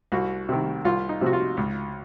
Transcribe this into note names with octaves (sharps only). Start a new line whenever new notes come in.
C2 F#4
C3 D#3
C2 F4
D#4
C3 F3 F#4
F4
C#2